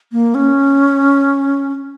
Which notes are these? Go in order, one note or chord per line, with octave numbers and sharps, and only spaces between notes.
A#3
C#4